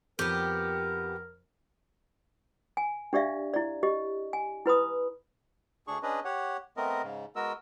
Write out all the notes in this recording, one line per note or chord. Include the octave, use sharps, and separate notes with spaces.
F2 B3 G4 A#4
G#5
D4 G4 D5 E5 F5
E4 D5
G4 D#5
G#5
E4 B4 B5 D#6
D2 D4 G#4 C#6
C#4 D4 G#4 B4 D#5
G4 C#5 F#5
A3 B3 C4 A#4 D#5
G#2 C#3
G#3 B3 F#4 A#4 D#5 E6